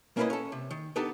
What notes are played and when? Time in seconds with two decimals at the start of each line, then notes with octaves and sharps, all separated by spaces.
0.17 A#3 C#4 E4 A4 B4 D#5
0.30 C#4 A4
0.52 C3
0.71 D#3
0.96 B3 D4 D#4 G4 A4 B4